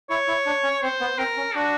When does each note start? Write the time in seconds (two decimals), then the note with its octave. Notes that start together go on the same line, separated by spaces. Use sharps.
0.10 E4 C#5
0.27 E4
0.46 D4
0.63 C#4
0.82 C4 C5
1.01 B3
1.18 C4 A#4
1.37 C#4
1.55 D4 F#4